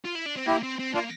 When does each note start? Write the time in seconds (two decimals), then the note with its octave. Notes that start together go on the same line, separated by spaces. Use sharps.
0.05 F4
0.15 E4
0.26 D4
0.37 C4
0.47 A#3 E4 G4
0.63 C4
0.79 C4
0.94 A#3 D4 F4